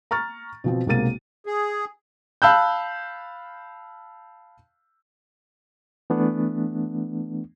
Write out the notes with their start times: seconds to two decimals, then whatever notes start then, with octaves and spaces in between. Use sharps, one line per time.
0.11 A#5 C#6 F6 A6
0.64 B2 F3 C4
0.87 B1 C3 G#3 A#3 A6 D#7
1.46 G#4
2.42 F5 A5 B5 E6 F#6 G6
6.10 E3 A3 B3 D4